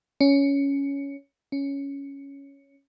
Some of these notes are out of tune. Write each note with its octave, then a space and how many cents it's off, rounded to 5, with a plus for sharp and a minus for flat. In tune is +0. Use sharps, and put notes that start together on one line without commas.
C#4 +10
C#4 +5